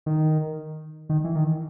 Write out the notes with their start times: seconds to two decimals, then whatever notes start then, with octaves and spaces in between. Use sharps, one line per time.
0.06 D#3
1.09 D#3
1.24 E3
1.36 D#3